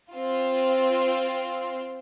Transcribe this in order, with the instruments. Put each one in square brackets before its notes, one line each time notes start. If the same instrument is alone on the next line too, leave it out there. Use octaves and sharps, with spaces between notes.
[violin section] C4 F4